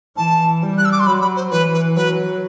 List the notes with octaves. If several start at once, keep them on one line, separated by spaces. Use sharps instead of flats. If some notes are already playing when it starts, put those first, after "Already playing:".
E3 A5
G3
F#6
E6
D6
C6
F#3 B5
B5
C5
E3 B4
B4
F#3 B4